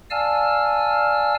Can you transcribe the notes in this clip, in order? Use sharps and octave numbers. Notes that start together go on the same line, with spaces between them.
D5 F5 G#5 A5 E6 F6